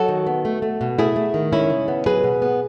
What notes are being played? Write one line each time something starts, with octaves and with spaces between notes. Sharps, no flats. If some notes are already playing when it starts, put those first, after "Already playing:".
Already playing: F#3 F#4 A4
D#3
B3
A3
A3
B2
A3 E4 G#4
A3
D#3
G#3 C#4 E4
C#3
B3
F#3 G#4 B4
B2
B3